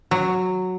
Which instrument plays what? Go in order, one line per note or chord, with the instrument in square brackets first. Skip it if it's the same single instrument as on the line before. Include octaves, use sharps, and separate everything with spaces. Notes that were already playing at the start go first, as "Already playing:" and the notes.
[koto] F#3